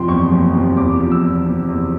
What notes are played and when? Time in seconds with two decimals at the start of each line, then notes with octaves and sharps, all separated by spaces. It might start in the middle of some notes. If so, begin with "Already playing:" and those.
Already playing: F#1 C3 F3 G5 C6
0.08 E2 C#6
0.31 F#1
0.54 C3
0.77 E2 D6
1.00 F3
1.12 E6
1.22 E2
1.46 C3
1.68 E2